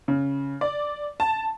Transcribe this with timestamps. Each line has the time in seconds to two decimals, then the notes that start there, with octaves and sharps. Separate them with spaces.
0.08 C#3
0.61 D5
1.20 A5